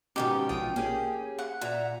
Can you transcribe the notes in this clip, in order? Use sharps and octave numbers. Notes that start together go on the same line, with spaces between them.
G#2 B2 D#3 C#4 G4
A#1 F4 G5 D#6
A#3 C#4 G4 G#4
F#5
A#2 E5 A#5